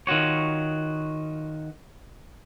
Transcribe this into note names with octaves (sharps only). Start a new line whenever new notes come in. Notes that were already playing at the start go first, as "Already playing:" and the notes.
D#3 F4 F#4 C#5